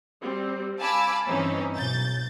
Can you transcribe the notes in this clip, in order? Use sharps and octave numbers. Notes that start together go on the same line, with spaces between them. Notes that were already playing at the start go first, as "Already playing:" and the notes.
G3 C4
F5 G#5 A5 B5 D6 E6
G2 E3 C4 C#4 D#4
B1 G6 A6